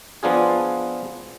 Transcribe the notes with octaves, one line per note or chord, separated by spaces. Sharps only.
F3 B3 D4 F4 G#4